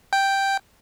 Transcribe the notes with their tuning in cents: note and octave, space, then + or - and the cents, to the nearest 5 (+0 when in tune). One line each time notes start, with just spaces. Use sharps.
G5 +0